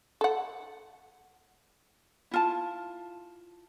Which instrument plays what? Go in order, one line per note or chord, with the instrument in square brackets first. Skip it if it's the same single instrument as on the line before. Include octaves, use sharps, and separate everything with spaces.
[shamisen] A4 F#5
[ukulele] E4 F4 A5